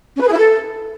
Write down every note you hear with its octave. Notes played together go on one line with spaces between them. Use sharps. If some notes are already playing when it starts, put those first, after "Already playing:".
C#4
B4
G#4
E4
A4